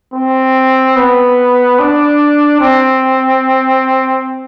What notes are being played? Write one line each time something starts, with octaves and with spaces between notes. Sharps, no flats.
C4
B3
D4
C4